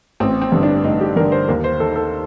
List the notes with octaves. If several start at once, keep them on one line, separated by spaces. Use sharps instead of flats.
A1 C4
C4
G2 D3
D4
A1 D#4
G4
G2 D3 A#4
C5
D#2 A#4
C5
D#3 A4
A4